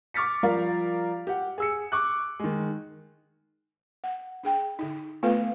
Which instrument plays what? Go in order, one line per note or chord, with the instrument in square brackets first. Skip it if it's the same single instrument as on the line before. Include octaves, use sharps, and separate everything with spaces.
[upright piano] C#6 D6 F6 A6 B6 C#7
F3 G3 A#4 D5 F5
G4 F#5
G#4 E6 C#7
C#6 D6 F#6
D#3 G#3
[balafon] F#5
D4 G#4 G5
D3 D#4
A3 B3 F4 A4 B4 F5